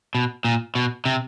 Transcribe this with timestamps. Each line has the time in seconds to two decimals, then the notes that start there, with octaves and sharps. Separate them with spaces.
0.15 B2
0.45 A#2
0.75 B2
1.05 C3